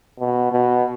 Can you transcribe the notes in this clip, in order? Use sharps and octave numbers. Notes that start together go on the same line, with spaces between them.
B2
B2